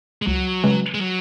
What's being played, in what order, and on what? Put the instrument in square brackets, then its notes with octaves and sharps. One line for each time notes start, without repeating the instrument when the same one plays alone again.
[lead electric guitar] G#3
[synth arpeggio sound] C#2 [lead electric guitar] F#3
[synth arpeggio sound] C#3 G#3 C#4 B4
[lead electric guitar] G#3
F#3